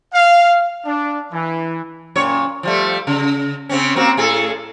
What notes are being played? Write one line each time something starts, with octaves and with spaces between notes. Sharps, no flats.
F5
D4
E3
F#2 A#2 C#5
F3 G3 A3
C#3
C#3 C4 C#4
A#3 C4 F#4
A2 G#4 A4